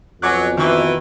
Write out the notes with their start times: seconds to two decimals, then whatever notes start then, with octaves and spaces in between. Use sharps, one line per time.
0.22 F2 B2 F#3 G#5 D6 F#6
0.57 D#3 E3